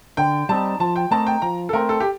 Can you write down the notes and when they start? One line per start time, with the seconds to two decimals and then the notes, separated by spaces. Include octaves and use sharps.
0.17 D3 G5
0.49 G3 C4 D#4 A5
0.80 F3 A5
0.96 G5
1.11 A3 C4 D#4 A#4 A5
1.27 G5
1.42 F3 A#5
1.69 A4
1.73 A3 C4 A#4
1.89 A4
2.00 G4